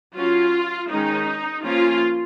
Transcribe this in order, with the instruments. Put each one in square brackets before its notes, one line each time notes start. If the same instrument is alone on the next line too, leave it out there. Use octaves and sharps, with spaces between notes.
[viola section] F#3 C#4 F4
D#3 G#3 C#4 D#4
F3 A#3 C#4 F4